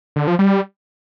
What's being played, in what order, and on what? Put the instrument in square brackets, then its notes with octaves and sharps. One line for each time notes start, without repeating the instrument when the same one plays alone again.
[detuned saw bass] D3
F3
G3